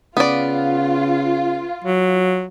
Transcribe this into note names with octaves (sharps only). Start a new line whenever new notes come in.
C#3 B3 F4 D5
F#3